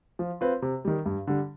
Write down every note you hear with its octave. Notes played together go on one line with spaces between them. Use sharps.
F3
C4 F4 B4
C3
D#3 G3
G2
D3 G3